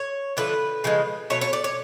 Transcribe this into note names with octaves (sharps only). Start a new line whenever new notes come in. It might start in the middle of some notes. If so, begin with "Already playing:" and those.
Already playing: C#5
D3 F3 A3 B4
C#3 F3 G#3
B2 F#3 A3 C#5
C#5
D5
C#5